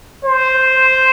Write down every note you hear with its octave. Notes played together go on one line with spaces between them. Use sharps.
C5